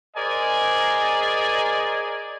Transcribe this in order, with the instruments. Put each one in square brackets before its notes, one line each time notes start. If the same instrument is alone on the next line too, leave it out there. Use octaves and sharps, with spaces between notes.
[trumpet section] G#4 A#4 C5 D5 D#5 G#5